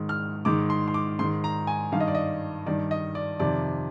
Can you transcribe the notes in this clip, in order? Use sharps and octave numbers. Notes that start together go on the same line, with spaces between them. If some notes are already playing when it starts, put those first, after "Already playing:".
Already playing: G#2 D#3
F6
G#2 D#3 D6
C6
C6
D6
G#2 D#3 C6
A#5
G#5
G2 D#3 F5
D#5
D5
D#5
G2 D#3 D5
D#5
D5
F2 C3 D#3 D5